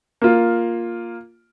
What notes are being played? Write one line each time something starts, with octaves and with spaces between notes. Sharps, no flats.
A#3 F4